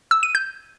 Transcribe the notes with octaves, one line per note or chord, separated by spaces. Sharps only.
E6
D#7
G6